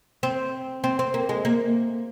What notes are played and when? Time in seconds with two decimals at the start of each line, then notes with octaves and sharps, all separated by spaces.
0.23 C4
0.84 C4
0.99 C4
1.14 A#3
1.29 G#3
1.45 A#3